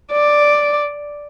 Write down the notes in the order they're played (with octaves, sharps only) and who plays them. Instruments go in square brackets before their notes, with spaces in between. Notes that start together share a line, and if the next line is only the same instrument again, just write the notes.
[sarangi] D5